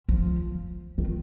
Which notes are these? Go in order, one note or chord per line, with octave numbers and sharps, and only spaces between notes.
F3
D#3